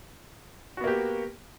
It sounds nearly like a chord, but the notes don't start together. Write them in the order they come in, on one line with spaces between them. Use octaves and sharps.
F#4 B3 A#3 G4